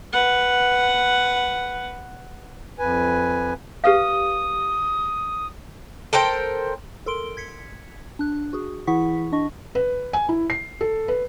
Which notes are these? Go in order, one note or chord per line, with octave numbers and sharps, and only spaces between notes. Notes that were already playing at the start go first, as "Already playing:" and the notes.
B4 F#5
F2 B4 G#5
G4 B4 F5 D#6
A4 A#4 C5 G5
A4 A#4 C6 D7 G7
G#6 B6 C#7
D4 F#6
F#4 G#4
E3 E4 G#4 F#5 C#6 B6
D4 D#5 C#6
B4
G#5
E4
C7
A4
B4